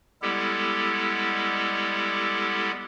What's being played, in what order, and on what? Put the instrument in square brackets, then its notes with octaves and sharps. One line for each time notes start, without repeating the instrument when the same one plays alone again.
[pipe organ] G3 G#3 B3 E4 G4 A4